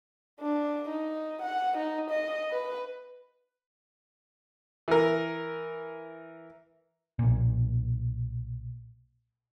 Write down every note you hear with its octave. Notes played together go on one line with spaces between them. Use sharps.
D4
D#4
F#5
D#4
D#5
B4
E3 A#4
B1 A#2